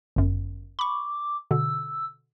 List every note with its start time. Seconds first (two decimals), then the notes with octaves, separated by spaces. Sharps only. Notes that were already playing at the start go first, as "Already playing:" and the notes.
0.16 G1 F#2
0.79 B5 C#6 D6
1.51 B2 D3 E6